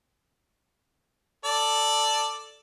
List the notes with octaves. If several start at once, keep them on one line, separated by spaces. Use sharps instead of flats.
A4 D5